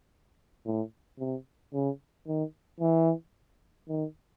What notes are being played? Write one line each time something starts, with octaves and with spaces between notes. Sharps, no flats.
A2
C3
C#3
D#3
E3
D#3